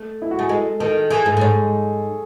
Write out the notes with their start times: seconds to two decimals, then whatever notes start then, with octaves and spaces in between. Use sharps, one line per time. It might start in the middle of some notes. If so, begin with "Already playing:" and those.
Already playing: A3
0.22 E4
0.31 F#4
0.39 A3 G#4
0.49 G#3 A4
0.80 D#3 A4
1.10 E3 G#4
1.25 G#2 A4
1.37 A2
1.41 G#2 C#5